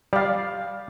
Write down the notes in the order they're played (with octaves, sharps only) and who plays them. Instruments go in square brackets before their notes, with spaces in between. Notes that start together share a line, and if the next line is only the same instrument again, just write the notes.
[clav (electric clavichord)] G3 [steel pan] D5 F5